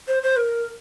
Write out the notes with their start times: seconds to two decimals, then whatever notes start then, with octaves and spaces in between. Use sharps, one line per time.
0.08 C5
0.23 C5
0.37 A#4